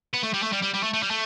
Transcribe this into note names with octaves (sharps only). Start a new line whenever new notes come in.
B3
A3
G3
A3
G3
G3
G3
A3
A3
G3
A3